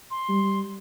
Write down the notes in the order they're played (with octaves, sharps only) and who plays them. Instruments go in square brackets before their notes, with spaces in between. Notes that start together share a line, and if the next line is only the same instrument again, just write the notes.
[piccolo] C6
[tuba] G3